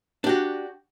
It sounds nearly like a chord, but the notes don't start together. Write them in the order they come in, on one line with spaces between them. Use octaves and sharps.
D4 G4 F#4